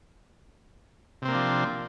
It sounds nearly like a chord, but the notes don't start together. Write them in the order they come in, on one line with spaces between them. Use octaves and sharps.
C3 C4 A#3 D4 F3